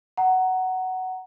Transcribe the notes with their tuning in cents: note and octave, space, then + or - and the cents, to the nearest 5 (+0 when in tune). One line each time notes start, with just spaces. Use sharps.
F#5 +10 A#5 +0